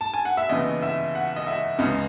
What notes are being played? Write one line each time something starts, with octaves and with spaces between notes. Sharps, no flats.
A5
G#5
F#5
E5
D#2 C#3 E3 B3 D#5
E5
F#5
D#5
E5
C#2 C#3 G#3 B3 D#5